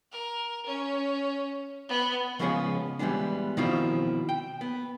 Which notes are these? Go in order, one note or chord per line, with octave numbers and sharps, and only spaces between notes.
A#4
C#4
B3
C#3 F3 G#3 B3 C#4 G#4
E3 G3 G#3 B3 D4
B2 D#3 F3 C4 E4 F4
G5
B3